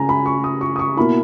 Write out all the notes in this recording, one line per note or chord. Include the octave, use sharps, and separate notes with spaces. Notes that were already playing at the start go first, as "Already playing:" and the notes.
Already playing: C#3 G#5 A#5
B5
C#6
D#6
C#6
D#6
C#6
B2 A#3 E4 B5